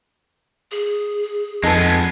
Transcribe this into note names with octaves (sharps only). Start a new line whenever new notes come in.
G#4
F2 G#3 B3 D#4 A4 B4